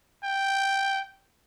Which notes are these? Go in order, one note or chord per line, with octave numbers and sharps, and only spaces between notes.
G5